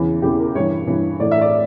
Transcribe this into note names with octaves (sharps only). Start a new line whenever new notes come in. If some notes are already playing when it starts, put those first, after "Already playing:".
Already playing: E2 C#3 E3
E2 C#3 E3 G4
A#4
G2 E3 C#5
G2 E3
A2 E3 D5
E5
D5